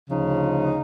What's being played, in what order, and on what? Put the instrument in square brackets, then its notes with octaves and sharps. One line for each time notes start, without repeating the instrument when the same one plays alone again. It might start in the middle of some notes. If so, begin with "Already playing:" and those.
[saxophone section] D2 C#3 F3 D#4